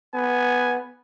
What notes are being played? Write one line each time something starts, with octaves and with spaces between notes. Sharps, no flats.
B3 G#5